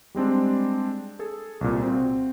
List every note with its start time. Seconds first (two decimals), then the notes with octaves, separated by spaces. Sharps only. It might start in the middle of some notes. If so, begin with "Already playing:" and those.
0.15 G3 G#3 C4 D4
1.19 G#4 A4
1.61 C2 A#2
1.83 C4 F#4